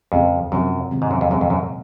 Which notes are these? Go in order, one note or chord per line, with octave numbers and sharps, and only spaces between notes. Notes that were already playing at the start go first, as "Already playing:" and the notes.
F2 C#3 G#3 C4 F4 A#4
F#2 C3 F3 C4 F#4
C3 D#3 G#3 C4
G#2
F#2
F2
F#2 A#2 G#3 C4
F2
F#2